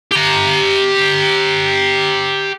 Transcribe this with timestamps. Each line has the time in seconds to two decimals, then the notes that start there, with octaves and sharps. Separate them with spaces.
0.12 G4 A#5